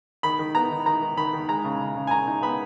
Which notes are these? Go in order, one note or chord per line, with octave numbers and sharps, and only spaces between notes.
D#3 B5
D#3
B3 A#5
D#3
D#3 A#5
D#3
D#3 B5
D#3
G#3 A#5
C#3
C#3
C#3
G#5
C#3 A#5
D#4
B3 B5